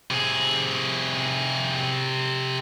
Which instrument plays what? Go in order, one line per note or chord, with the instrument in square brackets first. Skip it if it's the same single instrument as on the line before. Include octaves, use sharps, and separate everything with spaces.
[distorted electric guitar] C3 G#4